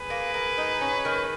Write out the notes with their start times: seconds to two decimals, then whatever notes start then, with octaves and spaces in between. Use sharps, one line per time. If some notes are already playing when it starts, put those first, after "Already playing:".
Already playing: G#4 B4
0.10 A#3
0.34 A#3
0.58 D#4
0.81 C#4
1.05 D#3